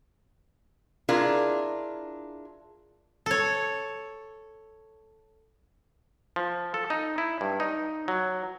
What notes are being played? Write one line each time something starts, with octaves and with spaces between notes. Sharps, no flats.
D4 E4 F4 G#4 A#4
A4 C#5
F3
A4
D#4
E4
G2
D#4
F#3